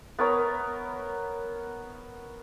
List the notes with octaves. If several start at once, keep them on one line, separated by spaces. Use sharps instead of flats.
B3 A#4 C#5 A#5